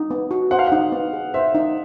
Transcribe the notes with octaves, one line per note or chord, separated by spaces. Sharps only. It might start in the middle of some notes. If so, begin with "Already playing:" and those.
Already playing: D#4
B3
F#4
C5 F#5
F5
D#4 F#5
B3
G#4
C5 E5
D#4